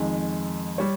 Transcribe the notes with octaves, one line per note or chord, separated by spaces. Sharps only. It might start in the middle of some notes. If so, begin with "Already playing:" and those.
Already playing: F2 D#3 G#3
G3 C#5